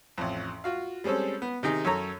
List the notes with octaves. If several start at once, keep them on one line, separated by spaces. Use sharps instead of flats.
A1 F2
F4 F#4 F5
G3 G#3 C4 C#4 A4
B3
C3 D#3 D#4 G#4
F#2 A4 C#5 A#5